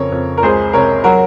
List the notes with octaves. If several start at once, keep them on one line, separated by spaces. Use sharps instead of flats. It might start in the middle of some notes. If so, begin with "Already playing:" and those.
Already playing: F2 C#3 A#4 C#5
F2
A#4
C#2 G#4 C5
C3 A#4 C#5
F#3 F#4 A#4